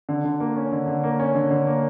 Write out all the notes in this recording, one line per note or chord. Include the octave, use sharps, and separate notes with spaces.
D3
D3
A#3
C#4
D3
D3
A#3
C#4
D3
D3
A#3